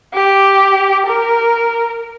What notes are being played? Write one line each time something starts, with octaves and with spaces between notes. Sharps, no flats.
G4
A#4